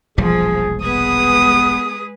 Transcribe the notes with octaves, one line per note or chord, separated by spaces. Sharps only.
E1 A#1 F3 G3 G#4
G#3 B3 G#4 B4 D#6